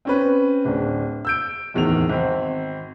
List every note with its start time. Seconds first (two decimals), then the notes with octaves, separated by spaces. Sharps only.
0.05 C4 C#4 B4
0.65 D1 D4
1.25 E6 G6 D7
1.74 D1 E2 D#3 F7
2.09 G#1 C4